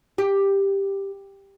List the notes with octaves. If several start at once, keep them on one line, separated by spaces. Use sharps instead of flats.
G4